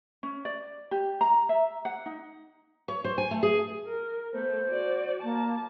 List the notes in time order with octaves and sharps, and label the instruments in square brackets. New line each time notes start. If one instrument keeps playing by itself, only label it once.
[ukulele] C#4
D5
G4
A#5
E5
F#5
D#4
[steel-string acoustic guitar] C#5
C5
G#5
A3
G#4
[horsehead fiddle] A#4
[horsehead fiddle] A3 B3 [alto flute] C5
[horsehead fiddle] F#4 D5
[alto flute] A#3 [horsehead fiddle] A5